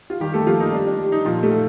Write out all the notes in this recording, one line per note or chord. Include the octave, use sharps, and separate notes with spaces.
F4
D#3 G3 G4
A3 A4
F3 A#3 F4
D#4
G3 D4
D4
G3
D#4
A#2 F3 F4
A3 A4
A#2